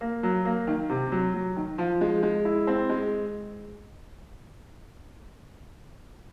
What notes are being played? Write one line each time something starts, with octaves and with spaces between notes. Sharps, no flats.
A#3
F#3
A#3
D#3
C3
F#3
F#3
D#3
F3
G#3
G#3
E4
C4
G#3